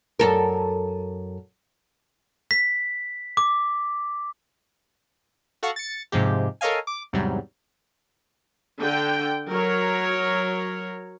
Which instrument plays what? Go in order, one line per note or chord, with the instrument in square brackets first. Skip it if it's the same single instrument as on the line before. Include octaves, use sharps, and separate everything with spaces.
[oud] F#2 A4 A#4
[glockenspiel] B6
D6
[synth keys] F#4 A4 F5 F#5 C#6
A6 C#7
G#2 C3 F3 G#3 G4
A4 A#4 C#5 D#5 F5 G#5
D6
E2 G#2 C3 F#3 G3
[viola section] D3 G5
F#3 A#4 C#5